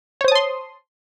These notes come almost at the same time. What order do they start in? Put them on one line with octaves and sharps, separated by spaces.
C#5 C5 D#6 A5 C6